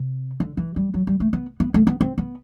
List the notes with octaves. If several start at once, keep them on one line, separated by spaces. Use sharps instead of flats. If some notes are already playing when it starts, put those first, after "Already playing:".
Already playing: C3
D3
E3
G3
F#3
G3
A3
B3
B3
A3
B3
C4
B3